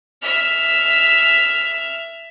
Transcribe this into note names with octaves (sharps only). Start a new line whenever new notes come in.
E5 F6